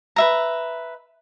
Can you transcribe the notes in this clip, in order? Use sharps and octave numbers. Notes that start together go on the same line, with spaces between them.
B4 E5 A#5